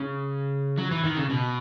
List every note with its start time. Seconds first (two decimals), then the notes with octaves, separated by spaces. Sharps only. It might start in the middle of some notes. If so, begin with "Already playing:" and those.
Already playing: C#3
0.78 F#3
0.91 E3
1.04 D#3
1.18 C#3
1.30 B2